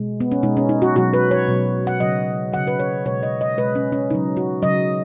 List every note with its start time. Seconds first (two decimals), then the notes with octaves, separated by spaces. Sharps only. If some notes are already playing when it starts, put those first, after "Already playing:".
Already playing: B2 G#3
0.20 B3
0.32 C#4
0.43 B2 G#3 D#4
0.57 C#4
0.69 D#4
0.82 F#4
0.96 B2 F#3 F#4
1.14 B4
1.31 C#5
1.48 B2 F#3
1.87 F#5
2.00 C#3 F#3 D#5
2.52 C#3 F#3 F#5
2.67 B4
2.79 C#5
3.05 B2 G#3 C#5
3.23 D#5
3.41 D#5
3.57 B2 G#3 B4
3.75 C#4
3.92 C#4
4.10 C#3 F#3 D#4
4.37 F#4
4.62 C#3 F#3 D#5